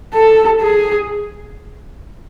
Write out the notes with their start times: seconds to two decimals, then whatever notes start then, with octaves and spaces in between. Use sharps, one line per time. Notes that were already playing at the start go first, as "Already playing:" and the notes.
0.14 A4
0.61 G#4